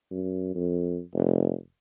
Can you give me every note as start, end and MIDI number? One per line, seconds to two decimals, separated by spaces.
0.11 0.53 42
0.55 0.99 41
1.14 1.53 29